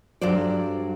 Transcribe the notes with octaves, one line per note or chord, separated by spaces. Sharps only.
G2 F#3 A4 C5 D5